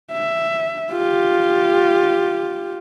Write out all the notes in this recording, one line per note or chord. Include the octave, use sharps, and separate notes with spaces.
E5
F4 G4